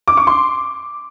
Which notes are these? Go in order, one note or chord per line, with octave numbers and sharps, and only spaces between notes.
D6
C#6
C6